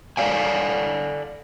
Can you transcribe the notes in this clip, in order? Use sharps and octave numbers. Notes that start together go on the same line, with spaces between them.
A4 A#4 D5 F5 G#5